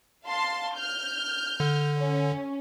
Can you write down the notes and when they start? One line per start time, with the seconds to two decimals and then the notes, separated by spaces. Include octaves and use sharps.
0.25 F5 A5 C6
0.77 F6 G6
1.60 D3
1.98 C#4